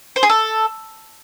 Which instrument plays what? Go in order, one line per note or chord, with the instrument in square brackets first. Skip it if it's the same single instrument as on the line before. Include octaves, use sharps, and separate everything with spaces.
[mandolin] C5
G#4
A4